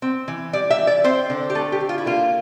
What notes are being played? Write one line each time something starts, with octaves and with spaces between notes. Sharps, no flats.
C4
E3
G3 D5
E5
E3
D5
C4 C5
D3
G4
A3 A4
G4
D3
F4
E4
A#3 F4